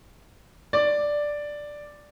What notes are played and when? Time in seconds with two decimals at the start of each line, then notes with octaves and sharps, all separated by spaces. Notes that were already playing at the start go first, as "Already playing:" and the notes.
0.73 D5